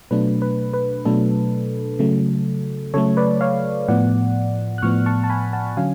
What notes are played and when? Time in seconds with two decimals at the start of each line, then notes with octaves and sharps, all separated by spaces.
0.11 B2 F#3 A3 D4 B4
0.42 B4
0.74 B4
1.05 B2 F#3 A3 D4 A4
1.99 C#3 F#3 A3
2.94 C#3 F#3 A3 A4 C#5
3.17 B4 D5
3.41 C#5 F5
3.88 A2 F3 B3 D5 F#5
4.78 F#6
4.82 A2 F3 B3 C#6 F6
5.06 A5 C#6
5.24 A5
5.30 G#5 B5
5.53 F#5 A5
5.77 D3 F#3 C#4 F5 G#5